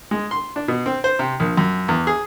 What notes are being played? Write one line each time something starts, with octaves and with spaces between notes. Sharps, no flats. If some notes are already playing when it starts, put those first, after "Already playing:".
G#3
C6
D4
B2
C4
C5
C3
A#1
F#2
E2
G#4